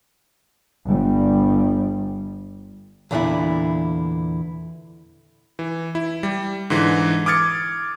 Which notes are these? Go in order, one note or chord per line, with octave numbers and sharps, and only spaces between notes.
G1 G3
E2 A#2 D3 D4 E4
E3
E4
G3
G#2 D3 E3
D6 D#6 F6 G#6 A6 C#7